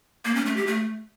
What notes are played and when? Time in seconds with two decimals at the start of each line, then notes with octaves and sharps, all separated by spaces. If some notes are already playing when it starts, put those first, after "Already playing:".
0.25 A#3
0.35 C#4
0.46 A3
0.56 G4
0.67 A3